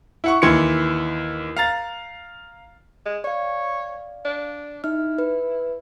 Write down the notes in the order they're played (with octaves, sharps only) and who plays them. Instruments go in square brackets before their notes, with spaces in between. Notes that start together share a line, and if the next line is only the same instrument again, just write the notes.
[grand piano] E4 F#5 C#6
D#2 E3 C6 G#6 C#7
F5 A#5 A6
[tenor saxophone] G#3
[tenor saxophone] C#5 [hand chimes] D5 F5
[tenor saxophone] D4
[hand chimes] D#4 F6 [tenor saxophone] E4
[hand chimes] B4